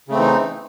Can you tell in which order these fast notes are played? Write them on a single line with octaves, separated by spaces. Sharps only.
C#3 A3 C4 E3 D#4